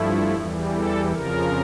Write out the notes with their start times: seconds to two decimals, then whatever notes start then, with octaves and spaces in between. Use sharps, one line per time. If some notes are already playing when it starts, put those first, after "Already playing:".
Already playing: G2 F3 A3 E4
0.34 E2 E3 G3
0.74 A4
1.12 F2 C#3 F3 A#4